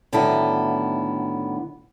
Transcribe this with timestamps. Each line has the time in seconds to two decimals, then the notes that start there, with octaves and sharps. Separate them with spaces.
0.13 A2 D3 D#3 F#3 B3 E4